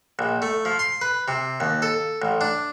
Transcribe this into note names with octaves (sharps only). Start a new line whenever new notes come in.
A#1
A3
F3
C6
B4
C3
D#2
A4
A1
D4